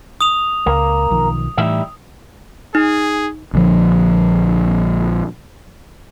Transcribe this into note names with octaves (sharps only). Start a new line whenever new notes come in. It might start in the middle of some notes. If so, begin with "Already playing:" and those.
D#6 F7
C#2 A#3
B1 D#3 F3
A2 E3 G3 D#4 E5
D#4 G#4
A#1 D3 F3